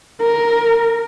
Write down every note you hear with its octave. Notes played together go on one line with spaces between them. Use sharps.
A#4